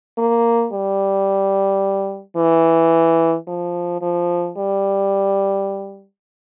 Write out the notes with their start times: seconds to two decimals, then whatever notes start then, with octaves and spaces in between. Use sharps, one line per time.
0.18 A#3
0.73 G3
2.36 E3
3.47 F3
4.02 F3
4.57 G3